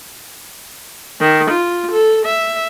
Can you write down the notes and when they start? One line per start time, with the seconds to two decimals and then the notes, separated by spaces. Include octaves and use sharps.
1.20 D#3
1.50 F4
1.92 A4
2.26 E5